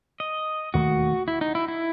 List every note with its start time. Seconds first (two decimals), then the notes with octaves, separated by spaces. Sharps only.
0.20 D#5
0.74 E1 D#2 D#3 A3 F#4
1.28 E4
1.41 D#4
1.55 E4
1.68 E4